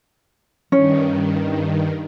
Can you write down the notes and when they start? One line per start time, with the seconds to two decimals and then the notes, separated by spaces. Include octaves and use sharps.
0.72 G2 D#3 C#4